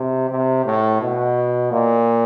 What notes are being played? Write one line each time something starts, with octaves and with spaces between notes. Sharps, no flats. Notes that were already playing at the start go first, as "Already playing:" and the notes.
Already playing: C3
C3
A2
B2
A#2